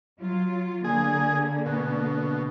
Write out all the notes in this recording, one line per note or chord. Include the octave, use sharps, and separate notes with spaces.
F#3 F4
D3 A#3 G#4
B2